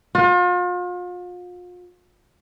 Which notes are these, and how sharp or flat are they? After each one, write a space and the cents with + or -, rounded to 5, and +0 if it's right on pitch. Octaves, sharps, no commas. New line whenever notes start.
F4 +40